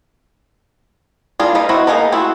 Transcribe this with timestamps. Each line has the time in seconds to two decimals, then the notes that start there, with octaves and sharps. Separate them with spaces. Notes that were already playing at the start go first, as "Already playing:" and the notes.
1.40 G3 A#3 D4 F4 G#4
1.55 A#3 D#4 G4 D#5 B5
1.69 B3 C4 D#4 E4 F#4
1.87 A#3 B3 D#4 G#4 A#4
2.12 A3 C4 E4 F#4 G#4